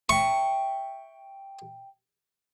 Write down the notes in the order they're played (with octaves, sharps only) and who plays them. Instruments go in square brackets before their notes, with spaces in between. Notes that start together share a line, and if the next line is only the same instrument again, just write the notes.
[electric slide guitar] E5 G5 [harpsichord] C#6